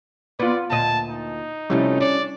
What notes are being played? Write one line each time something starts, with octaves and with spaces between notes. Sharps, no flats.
B3 F4 B4 D5
D2 A#2 D#5 A5
D#4
C3 F3 G3 A3 C#4 E4
D4 C#5 D5